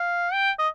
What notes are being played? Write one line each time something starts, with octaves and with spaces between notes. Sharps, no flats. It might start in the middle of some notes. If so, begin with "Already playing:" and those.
Already playing: F5
G5
D#5